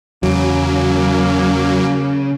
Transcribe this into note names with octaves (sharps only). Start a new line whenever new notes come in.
E2 C#3 F#3 A#3